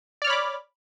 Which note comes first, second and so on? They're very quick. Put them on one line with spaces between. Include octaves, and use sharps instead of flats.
D5 F6 C#5 B5 D6